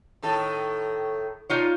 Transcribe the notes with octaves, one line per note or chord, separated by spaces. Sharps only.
A2 D#3 A4
D#4 F4 C#5